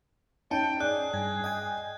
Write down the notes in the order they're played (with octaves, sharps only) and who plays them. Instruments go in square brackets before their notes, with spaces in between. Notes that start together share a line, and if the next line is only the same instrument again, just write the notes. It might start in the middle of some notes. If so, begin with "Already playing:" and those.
[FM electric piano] C#4 D#4 [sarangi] G5 [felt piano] A5
[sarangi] G#4 [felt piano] D5 [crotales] F#6
[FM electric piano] G2 [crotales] G#6
[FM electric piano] D#5 G5 G#5